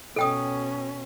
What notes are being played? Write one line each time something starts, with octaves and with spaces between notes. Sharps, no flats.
B2 C#4 A4 G5 D#6